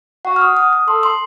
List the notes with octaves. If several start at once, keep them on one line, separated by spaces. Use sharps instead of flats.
F#4 F#5
F6
D#6
D#6
D#6
A4 C6
C6